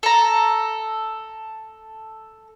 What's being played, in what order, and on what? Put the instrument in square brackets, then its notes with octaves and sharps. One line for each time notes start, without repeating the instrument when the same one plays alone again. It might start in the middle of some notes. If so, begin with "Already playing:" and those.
[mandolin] A4 A#5